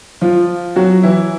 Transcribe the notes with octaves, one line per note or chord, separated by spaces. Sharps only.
F3 F4
F#3 F#4
E3 E4